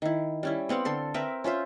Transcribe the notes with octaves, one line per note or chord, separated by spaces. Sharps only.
D#3 E4
G3 C#4 E4
B3 C4 F5 F#5
D3 A4 C6
C4 A#4 B4 E5
C#4 F4 C5 E5